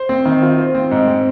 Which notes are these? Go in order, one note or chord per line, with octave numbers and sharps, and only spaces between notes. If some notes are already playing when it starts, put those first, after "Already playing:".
Already playing: C5
C4
D#3
F4
C5
C4
G#2
C4